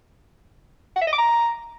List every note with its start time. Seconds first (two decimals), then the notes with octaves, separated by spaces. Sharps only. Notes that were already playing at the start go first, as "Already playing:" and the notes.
0.96 F#5
1.02 E5
1.07 D#5
1.13 D6
1.18 A#5